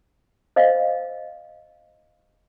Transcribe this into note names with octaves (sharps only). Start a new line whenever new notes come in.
C5 D#5 F5